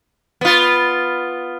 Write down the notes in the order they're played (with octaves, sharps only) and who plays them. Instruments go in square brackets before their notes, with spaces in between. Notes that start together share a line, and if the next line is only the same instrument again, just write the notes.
[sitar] B3 F4